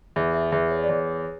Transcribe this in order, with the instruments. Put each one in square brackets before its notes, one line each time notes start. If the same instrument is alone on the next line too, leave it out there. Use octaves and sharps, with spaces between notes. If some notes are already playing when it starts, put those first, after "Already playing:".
[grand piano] E2 [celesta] E5
[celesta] E5
[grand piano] E2 [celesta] E5
[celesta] C#5
D5
[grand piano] E2 [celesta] C#5